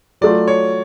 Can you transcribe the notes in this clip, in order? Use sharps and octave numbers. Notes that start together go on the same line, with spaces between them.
F#3 A3 F4 D5
C#5